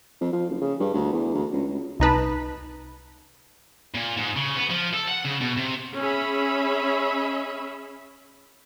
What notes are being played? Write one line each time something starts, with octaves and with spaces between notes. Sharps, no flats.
F2
F3
F#1
C#3
G2
D2
E2
D2
C#2
C#2
C2 D#4 B4 A5
A#2
G#2
C#3
B3
F3
A4
F#5
C#3
B2
C3
C#4 G#4 E5 B5